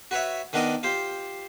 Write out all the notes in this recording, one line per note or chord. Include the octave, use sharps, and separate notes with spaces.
F#4 B4 C#5 E5
D#3 B3 D4 A#4 D5 D#5
F4 G4 C5